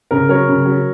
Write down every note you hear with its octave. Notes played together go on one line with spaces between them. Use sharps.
C#3 A#4
F#3 A#4 C#5
C#3
F#3